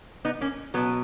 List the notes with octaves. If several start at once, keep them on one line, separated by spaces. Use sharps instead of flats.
B3 D#4
A#3 C#4
B2 F#3 B3